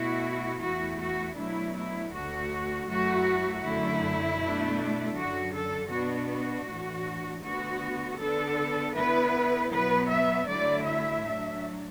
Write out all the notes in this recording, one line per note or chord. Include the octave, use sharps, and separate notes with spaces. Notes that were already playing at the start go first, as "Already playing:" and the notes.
Already playing: B2 A3 E4 F#4
E2 E3 A3 E4 F#4
F#4
B2 F#3 A3 D4 E4
E4
D2 D3 A3 F#4
F#2 F#3 A3 E4 F#4
F#2 D3 A3 E4
B2 A3 D4
F#2 D3 F#3 F#4
A4
B2 B3 D4 F#4
F#4
A2 E3 D4
D2 D3 B3 F#4
D3 B3 D4 A4
D3 B3 E4 B4
B2 F#3 B3 B4
E5
D3 F#3 A3 E4 D5
E5
A2 F#3 D4